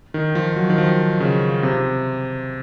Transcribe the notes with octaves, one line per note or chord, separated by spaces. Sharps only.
D#3
F3
F#3
D#3
F3
C#3
C3